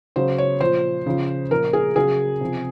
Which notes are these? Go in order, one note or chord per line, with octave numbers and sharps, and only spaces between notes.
C#3 F#3 C5
C#5
A#2 F3 C5
C#3 F3
A#2 F3 A#4
G#4
C#3 F#3 G#4
C3 F3